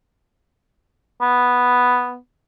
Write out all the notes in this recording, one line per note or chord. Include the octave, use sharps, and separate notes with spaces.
B3